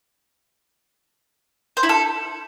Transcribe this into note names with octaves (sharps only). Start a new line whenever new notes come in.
C5
E4
A4